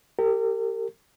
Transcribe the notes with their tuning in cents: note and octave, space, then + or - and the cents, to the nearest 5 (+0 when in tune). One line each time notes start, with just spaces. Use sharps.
G4 +0 A#4 -35